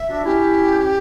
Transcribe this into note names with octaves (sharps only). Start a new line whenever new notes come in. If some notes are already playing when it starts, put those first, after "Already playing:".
Already playing: E5
D4 F#4
C#4 E4 G4